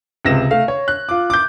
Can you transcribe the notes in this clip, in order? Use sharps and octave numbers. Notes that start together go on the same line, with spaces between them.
C#2 C3 A#6 E7
A3 F5
C#5
F#6
F4 D6
D6 G6